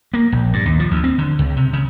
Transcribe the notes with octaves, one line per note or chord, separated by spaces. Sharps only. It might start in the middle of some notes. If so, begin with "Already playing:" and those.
A#3
A#1
G2
D#2
F3
D2
C4
D3
C#2
C3
C#3